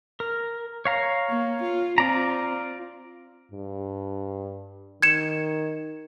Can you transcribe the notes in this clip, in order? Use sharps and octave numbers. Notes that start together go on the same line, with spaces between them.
A#4
C#5 F5 A#5
A#3
F4
C4 F4 D5 A#5
G2
D#3 G#6 C#7 E7